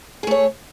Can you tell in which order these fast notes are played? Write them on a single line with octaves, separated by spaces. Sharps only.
G#4 A3 C#5